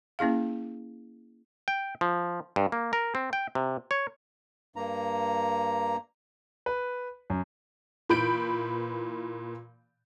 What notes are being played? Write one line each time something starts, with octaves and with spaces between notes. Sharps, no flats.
A#3 C#4 E4 G#4 F5
G5
F3
G2
A#3
A#4
C4
G5
C3
C#5
G2 A#3 A#5
B4
F#2
A#2 E3 B5 G6 D7